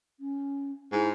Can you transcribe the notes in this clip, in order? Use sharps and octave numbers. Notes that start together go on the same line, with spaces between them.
C#4
G#2 E4